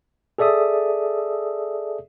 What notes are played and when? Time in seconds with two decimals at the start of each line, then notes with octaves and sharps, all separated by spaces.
0.38 G#4 A4 D5 E5 D#6